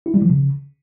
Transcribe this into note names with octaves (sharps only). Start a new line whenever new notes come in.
E4
G3
F3
C#3